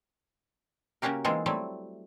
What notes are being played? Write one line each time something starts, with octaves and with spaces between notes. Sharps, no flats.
C#3 A#3 C#4 F#4 G4 A#4
E3 G#3 A#3 C4 D#4 A4
F#3 G3 A3 C4 E4